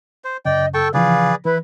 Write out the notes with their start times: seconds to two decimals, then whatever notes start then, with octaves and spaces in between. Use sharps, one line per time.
0.24 C5
0.45 F#2 C#3 D5 D#5 G5
0.74 A4 G5 A5 C#6
0.94 C#3 E3 F3 G#4 B4 D5 F5
1.45 E3 E4 B4